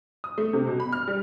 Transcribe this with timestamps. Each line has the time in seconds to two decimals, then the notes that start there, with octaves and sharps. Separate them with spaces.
0.24 D#6
0.38 A3
0.53 C3
0.67 B2
0.80 B5
0.92 F6
1.08 G3